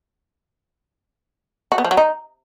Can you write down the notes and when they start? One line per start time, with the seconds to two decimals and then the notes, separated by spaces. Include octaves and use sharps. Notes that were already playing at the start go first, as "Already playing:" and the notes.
1.72 F#4
1.78 B3
1.84 F3
1.91 F#3
1.97 D#4